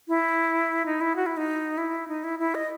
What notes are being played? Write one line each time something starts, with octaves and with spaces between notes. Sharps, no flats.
E4
D#4
E4
F#4
E4
D#4
E4
D#4
E4
E4
D#5